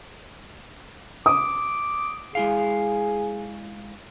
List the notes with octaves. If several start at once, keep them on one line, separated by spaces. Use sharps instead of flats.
D6 D#6
G#3 E4 G#4 F5